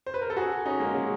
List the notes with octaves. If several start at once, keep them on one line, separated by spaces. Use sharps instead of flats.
C5
B4
A#4
A4
F#4 G#4
C#4 D#4
G#3 A#3
F#3 G#3